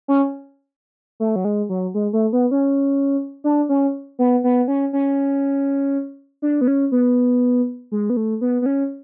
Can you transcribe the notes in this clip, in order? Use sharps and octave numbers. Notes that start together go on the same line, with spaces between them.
C#4
A3
F#3
G#3
F#3
G#3
A3
B3
C#4
D4
C#4
B3
B3
C#4
C#4
D4
B3
C#4
B3
G#3
B3
A3
B3
B3
C#4